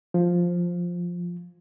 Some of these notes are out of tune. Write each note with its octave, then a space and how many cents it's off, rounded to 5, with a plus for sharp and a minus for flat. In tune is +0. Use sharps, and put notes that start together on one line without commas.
F3 +5